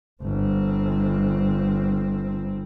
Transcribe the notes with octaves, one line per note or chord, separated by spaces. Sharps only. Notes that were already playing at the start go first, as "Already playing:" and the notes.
G1 C4